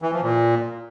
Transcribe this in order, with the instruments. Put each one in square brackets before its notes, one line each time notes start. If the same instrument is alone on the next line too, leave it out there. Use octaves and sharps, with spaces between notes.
[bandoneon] E3
F3
A#2